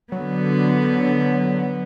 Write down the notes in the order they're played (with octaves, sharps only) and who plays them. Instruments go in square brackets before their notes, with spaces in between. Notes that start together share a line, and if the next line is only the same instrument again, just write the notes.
[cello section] D3 B3 [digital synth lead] F#3